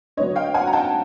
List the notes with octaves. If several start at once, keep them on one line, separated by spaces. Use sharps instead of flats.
D3 F#3 B3 D4 C#5 D#5
F5 G5
F#5 G#5
A#5
G5 A5